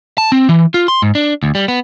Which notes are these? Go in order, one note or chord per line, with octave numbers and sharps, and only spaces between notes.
A5
C4
E3
F4
C6
G#2
D4
D2
G3
B3